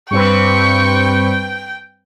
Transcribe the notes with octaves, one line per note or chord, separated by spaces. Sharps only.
G2 C4 B4 G5 C#6